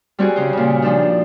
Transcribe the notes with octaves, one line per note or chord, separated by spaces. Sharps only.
G3 C4 F#4 G#4
C#3 C5
A#2 C#3
F3 C4 D4 D#4